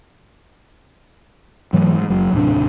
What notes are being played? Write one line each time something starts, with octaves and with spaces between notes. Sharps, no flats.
G#2 E3 F#3 A3
G#2
F#1 F#3
D#1 A2 C3 D4